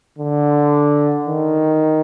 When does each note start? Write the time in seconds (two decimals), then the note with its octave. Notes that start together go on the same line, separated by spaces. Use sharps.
0.18 D3
1.27 D#3